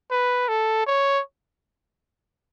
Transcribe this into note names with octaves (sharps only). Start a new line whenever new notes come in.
B4
A4
C#5